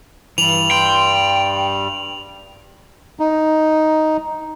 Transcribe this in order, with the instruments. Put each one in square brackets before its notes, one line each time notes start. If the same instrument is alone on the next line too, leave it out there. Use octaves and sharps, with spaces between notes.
[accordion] G2 G3 [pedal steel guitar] E3 [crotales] F7 F#7
[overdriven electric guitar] G5 [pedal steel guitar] C6
[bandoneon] D#4